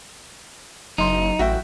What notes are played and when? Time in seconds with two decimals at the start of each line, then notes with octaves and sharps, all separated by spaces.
0.98 F#1 F#3 D#4 C6
1.39 A1 F#4 E5 G5